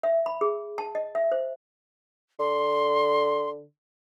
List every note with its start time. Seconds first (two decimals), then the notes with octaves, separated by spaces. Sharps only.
0.03 E5
0.26 B5
0.41 G#4
0.78 A5
0.95 D#5
1.15 E5
1.32 C5
2.39 D3 C6